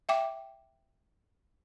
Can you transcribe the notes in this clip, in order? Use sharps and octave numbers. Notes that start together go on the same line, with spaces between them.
E5 G5 D6